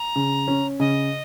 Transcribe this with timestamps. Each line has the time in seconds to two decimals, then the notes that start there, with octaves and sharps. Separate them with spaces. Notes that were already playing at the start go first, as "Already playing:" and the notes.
Already playing: A#5
0.16 C#3
0.47 C#4
0.80 C#3 D#5